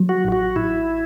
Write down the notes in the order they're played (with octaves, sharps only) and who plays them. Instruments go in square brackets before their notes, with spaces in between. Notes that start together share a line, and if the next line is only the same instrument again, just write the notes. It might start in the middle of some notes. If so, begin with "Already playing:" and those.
Already playing: [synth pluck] F#3
[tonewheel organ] F#4
[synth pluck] A1
[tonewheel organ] F#4
[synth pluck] A1 [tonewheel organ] E4